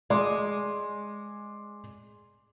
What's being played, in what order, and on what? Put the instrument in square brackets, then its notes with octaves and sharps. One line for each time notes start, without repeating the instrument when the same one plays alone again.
[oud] G#3 [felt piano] D5 C6 D6